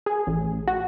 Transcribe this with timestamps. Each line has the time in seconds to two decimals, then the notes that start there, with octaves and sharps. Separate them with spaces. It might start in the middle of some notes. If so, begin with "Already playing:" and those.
0.06 G#4
0.27 A1
0.68 F#4